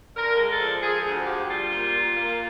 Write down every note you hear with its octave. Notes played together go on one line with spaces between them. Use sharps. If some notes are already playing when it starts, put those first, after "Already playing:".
D3 A#4
G#3
A4
F3
F3 G#4
D2
F3 G4
G3 F4
A#2
A#2
A#3